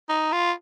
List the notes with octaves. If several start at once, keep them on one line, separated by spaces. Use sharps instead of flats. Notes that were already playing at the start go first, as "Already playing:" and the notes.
D#4
F4